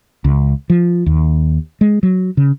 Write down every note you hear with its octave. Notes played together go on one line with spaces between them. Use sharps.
C#2
F3
D#2
G#3
F#3
C#3